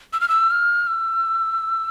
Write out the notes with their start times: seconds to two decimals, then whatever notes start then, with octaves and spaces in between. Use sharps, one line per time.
0.13 E6
0.21 F6
0.29 E6
0.51 F6
0.87 E6